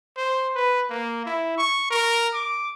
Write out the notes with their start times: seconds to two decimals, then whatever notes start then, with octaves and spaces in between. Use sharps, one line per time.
0.17 C5
0.55 B4
0.90 A#3
1.26 E4
1.58 C#6
1.90 A#4
2.34 D6